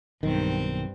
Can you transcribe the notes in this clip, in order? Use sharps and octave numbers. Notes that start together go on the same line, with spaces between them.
B1 G2 D#3 C4